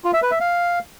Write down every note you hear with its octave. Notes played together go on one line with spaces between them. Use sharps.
F4
E5
B4
E5
F5